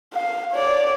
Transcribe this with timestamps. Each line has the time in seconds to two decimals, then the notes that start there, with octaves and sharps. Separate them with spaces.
0.13 F5
0.52 C#5 D5